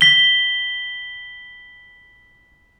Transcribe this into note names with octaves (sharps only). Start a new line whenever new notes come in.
B6 G7